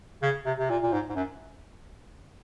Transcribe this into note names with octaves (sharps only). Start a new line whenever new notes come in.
C#3
C3
C3
A#2
A#2
G#2
G#2
F#2